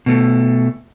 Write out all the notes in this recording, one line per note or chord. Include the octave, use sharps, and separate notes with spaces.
B2 A3